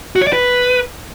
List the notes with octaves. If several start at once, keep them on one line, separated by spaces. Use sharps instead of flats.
F#4
C#5
D5
B4